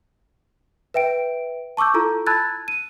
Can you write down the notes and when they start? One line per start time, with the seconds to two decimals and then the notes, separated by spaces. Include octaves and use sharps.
0.94 B4 E5 G5 D7
1.77 A5 C#6 D6 E6 G6
1.94 E4 F4 A4 A#5
2.27 A5 B5 E6 F#6 G#6 A6
2.68 D#7